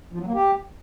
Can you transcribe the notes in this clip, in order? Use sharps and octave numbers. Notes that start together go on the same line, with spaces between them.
F3
F#3
A#3
G4